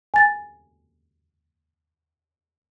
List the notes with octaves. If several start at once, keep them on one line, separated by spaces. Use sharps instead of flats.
G#5 A6